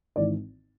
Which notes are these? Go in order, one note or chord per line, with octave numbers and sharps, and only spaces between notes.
G#1 G#2 E3 D5